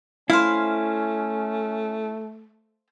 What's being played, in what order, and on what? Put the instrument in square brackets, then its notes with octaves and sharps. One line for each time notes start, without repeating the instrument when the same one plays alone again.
[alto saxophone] A3 [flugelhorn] C#4 [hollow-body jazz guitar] E4 [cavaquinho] C5 F5